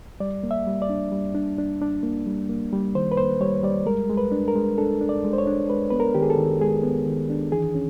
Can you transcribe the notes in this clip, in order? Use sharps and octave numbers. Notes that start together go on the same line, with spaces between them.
G3 D5
A#3
E5
G3
D5
D4
G3
D4
D4
D4
A#3
G3
A#3
G3
D#3 C5
B4
A#3 C5
G3 C#5
G3 D5
G#3 A#4
G#3
B4
D4
A#4
G#3
D4 A4
D4
D5
G#3
C5
C#5
D4
G#3 B4
B3 B4
A#4
D#3 G4
G#4
A4
D#3
G#3 G#4
B3
D#3
D4
E3 G#4
C#4